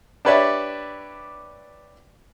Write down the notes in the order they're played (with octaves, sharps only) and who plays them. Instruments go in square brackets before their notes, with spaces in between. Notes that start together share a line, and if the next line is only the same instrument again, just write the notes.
[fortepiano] D4 G4 B4 C#5 D5 E5